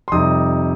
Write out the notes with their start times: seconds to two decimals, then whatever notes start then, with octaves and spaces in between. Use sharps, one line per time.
0.08 C6
0.12 F2 C3 G3 D#4 D#6